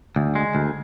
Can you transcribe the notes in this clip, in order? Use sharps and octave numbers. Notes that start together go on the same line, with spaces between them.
D2
G#3
D2